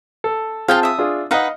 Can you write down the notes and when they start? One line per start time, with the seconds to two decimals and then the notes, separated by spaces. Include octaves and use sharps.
0.24 A4
0.68 C4 F4 G#4 F5 G5 A5
0.83 E5 D#6
0.98 D4 F4 G#4
1.31 D#4 B4 D#5 F5 F#5